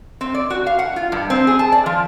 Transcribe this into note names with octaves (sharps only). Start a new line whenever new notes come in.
C4
D5
F#4
F5
F#5
F4
G2
C4
G#4
A5
D5
F3